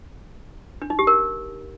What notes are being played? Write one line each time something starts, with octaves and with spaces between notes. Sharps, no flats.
D4
D#4
G4
A#4